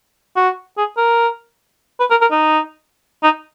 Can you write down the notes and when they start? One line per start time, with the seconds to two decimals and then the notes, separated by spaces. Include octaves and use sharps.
0.36 F#4
0.77 G#4
0.97 A#4
2.00 B4
2.10 A#4
2.21 A#4
2.31 D#4
3.23 D#4